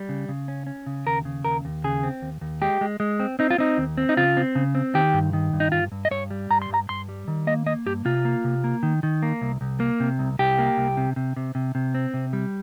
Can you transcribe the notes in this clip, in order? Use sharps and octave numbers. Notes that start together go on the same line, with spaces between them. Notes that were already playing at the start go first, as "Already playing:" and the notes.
Already playing: G3
C#3
C#3
C#4
C#4
C#3
D#2 A#4
C#3
D#2 A#4
D#2
C#3 G#4
C4
D#2
D#2
G#3 G4
G#3
G#3
C4
C4 D#4
F4
C4 D#4
D#2
C4
D#4
C#3 F4
C4
C#3
C4
D#3 G4
G2
D#3
G2
D#4
G2 F4
G2
D#5
G2 C#5
G3
G2 A#5
C6
G2 A#5
G2 C6
G3
D#3
A#3 D#5
A#3 D#5
G2 G4
C3 F4
A#3
C3
A#3
D#3
D#3
A#3
C2
C2
A#3
C3
C2
C2 G4
A#3
C2
C3
C3
C3
C3
C3
C4
C3
G3